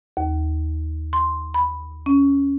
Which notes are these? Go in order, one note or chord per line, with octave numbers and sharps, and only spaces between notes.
D#2
C6
B5
C#4